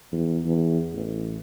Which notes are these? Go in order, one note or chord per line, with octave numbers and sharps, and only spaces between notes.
E2
E2
A1